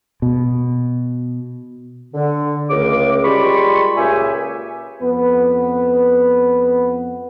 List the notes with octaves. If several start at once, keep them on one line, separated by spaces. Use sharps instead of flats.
B2
D3
C#2 C#3 A3 A#4 D6
G3 G#3 F4 G4 B5 C#6
C#2 A#2 G4 G#4 E5 G#5
F2 B3 B4